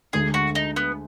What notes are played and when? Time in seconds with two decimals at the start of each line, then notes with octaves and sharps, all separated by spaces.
0.13 D2 D3 G#3 G#4
0.34 F#4
0.55 D#4
0.76 B3